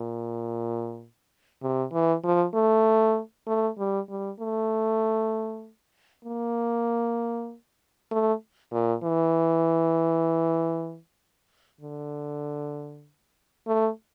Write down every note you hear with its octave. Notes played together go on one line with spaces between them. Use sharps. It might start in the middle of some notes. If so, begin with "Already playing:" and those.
Already playing: A#2
C3
E3
F3
A3
A3
G3
G3
A3
A#3
A3
A#2
E3
D3
A3